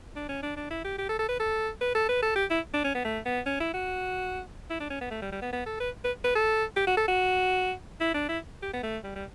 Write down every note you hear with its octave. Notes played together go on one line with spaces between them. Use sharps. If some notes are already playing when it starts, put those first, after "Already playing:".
D4
C#4
D4
D4
E4
G4
G4
A4
A4
B4
A4
B4
A4
B4
A4
G4
E4
D4
C#4
B3
A3
B3
C#4
E4
F#4
E4
D4
C#4
B3
A3
G3
G3
B3
B3
A4
B4
B4
B4
A4
G4
F#4
A4
F#4
E4
D4
E4
G4
B3
A3
G3
G3